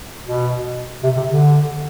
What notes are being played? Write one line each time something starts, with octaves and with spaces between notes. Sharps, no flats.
B2
C3
C3
D3